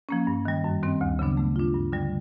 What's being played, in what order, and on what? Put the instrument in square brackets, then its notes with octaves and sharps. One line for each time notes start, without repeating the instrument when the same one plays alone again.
[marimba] F3 A#3 C#4
G2
D#3 G3
F#2
D#3 G3 C4
D2
C#3 F#3 B3 D4
A3
D4 F4
G2
D3 G3